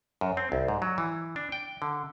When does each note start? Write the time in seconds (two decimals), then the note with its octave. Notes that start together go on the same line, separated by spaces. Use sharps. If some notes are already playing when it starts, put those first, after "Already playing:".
0.21 F#2
0.37 C4
0.52 C2
0.68 G#2
0.82 F#3
0.98 E3
1.36 D4
1.52 G5
1.82 D3